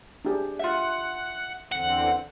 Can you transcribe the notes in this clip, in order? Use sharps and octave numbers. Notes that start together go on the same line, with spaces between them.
D4 G4 G#4
F4 E5 F#5
E2 D3 C4 F#5